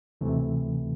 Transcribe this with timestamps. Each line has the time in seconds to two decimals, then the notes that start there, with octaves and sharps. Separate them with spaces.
0.21 D2 C3 E3 A3